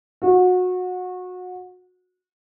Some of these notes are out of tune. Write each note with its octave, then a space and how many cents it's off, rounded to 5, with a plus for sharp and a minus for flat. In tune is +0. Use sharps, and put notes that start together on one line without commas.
F#4 -25